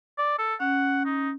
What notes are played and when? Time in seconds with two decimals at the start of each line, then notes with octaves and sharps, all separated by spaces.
0.18 D5
0.39 A4
0.60 C#4 F#5
1.06 D#4